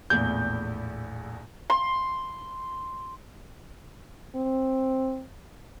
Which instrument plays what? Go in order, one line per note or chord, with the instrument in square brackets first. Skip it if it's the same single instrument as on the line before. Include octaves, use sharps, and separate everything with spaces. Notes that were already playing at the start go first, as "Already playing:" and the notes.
[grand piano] A#1 E2 A2 [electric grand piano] G6
[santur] C6
[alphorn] C4